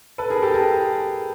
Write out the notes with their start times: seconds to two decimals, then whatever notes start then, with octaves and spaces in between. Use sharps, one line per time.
0.18 A4 B4
0.30 G#4 A#4
0.42 G4 A4
0.54 G#4 A#4